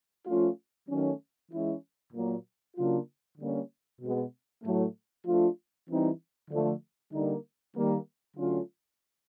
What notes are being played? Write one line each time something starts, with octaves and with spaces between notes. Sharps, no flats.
F3 A3 C#4 F4
D#3 F#3 A3 C#4
E3 G#3 C#4 E4
A#2 F#3 A#3
C#3 F#3 A#3 D4 F4
D3 G3 A#3 C#4
B2 G#3 B3
A2 F#3 A3
F3 A3 D4 F4
E3 G3 C4 D#4
D3 F3 A3
D3 G3 A#3 D#4
D#3 G3 A#3
D3 F#3 A3 C#4 F4